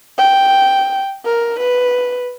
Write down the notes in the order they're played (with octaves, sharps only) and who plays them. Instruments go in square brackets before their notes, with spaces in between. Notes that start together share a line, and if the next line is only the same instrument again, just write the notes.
[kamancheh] G5
A#4
B4